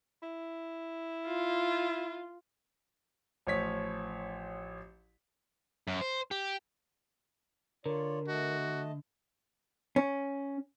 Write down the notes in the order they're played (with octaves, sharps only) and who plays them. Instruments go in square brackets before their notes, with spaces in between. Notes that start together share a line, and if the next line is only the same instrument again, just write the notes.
[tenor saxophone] E4
[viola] F4
[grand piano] A1 F3 C#5 B6
[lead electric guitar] F#2
C5
G4
[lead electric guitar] D3 [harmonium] F4 C#5 D5 [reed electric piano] A#4
[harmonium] A3 D#5 A5 [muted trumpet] F#4
[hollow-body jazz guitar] C#4